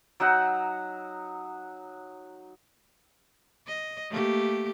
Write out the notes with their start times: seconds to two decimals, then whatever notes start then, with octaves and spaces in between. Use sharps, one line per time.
0.20 F#3 D#4 F#5 E6
3.67 D#5
4.10 A3 A#3 G4